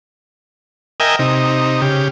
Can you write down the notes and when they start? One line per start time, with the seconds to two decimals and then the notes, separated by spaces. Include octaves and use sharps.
1.00 A#4 D#5 E5 G5 G#5
1.19 C3 D#4
1.81 C#3 G4